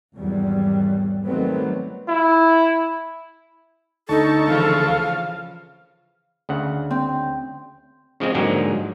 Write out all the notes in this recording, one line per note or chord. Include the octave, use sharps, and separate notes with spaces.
G#1 E2 F#3 G3
D#3 F#3 G3 A3 B3 C4
E4
D2 D#4 A4 A5 C#6
C#3 E3 F3 F5
D2 C#3 F#5
C4
C#3 F3 G#3 C4
G#2 D3 F3 F#3 G#3 A#3